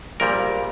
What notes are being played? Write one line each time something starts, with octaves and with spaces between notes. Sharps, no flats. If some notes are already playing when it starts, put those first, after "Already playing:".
A#1 A#2 G3 A#4